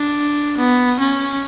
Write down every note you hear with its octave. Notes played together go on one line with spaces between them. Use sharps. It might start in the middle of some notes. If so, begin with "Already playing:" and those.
Already playing: D4
B3
C#4